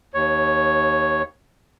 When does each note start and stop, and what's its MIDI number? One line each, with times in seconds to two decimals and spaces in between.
0.14 1.22 39
0.14 1.22 73